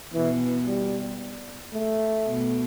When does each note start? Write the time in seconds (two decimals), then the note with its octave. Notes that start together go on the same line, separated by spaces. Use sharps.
0.13 B2 E3
0.67 G3
1.73 A3
2.27 B2